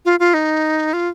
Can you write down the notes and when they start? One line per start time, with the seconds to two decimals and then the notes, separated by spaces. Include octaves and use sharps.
0.05 F4
0.20 F4
0.34 D#4
0.93 F4